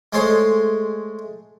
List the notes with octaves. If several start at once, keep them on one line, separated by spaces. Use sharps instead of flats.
G#3 A3 C5 C#5 C6